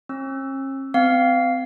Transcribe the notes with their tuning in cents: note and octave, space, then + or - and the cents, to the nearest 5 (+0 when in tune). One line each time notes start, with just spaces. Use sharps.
C#4 -45 E6 +0
C4 -35 F5 +0